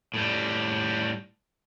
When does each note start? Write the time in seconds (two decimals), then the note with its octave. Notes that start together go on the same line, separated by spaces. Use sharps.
0.14 A2 G3